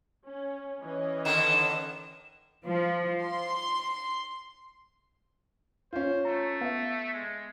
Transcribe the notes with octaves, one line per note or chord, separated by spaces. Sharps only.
C#4
E3 C#4 D#5
D3 D#3 E7
F3
C6
C#4 F4 C5
A3 A#5
B3 E5 F5
G#3